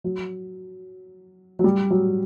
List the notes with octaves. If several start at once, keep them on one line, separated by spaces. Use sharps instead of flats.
F#3
F#3
G3
F#3